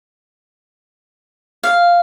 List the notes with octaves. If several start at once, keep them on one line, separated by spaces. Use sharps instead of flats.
F5